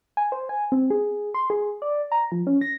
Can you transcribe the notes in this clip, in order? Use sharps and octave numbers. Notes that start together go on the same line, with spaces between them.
G#5
C5
G#5
C4
G#4
C6
G#4
D5
A#5
F3
C#4
A#6